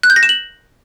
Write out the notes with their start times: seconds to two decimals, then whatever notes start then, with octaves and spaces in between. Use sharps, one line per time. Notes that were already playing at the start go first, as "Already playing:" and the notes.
0.03 F#6
0.10 G6
0.16 A#6
0.23 E7
0.29 F#7